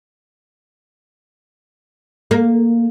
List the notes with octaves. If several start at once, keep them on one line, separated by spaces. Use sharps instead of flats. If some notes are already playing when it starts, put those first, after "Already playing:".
A#3